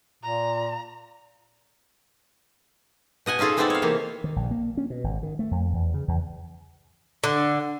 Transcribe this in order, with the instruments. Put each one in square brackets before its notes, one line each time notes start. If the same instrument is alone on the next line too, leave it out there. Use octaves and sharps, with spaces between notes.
[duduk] A#2 [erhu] A#5
[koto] B2 D#5 F#5 G#5
C#4 D#4 F4 G#4 A4
G#3 B3 C4 D#4 A4 D5
C#5 F5
C3 E3 A#3
[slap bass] D#3
A#1
A#3
C#4
B2
G#1
D#3
A3
F2
E2
C#3
E2
[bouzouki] D3